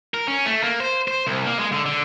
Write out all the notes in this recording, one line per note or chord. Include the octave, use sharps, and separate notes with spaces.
A#4
C#4
A3
A#3
C5
C5
C2
A#3
G#3
D3
D3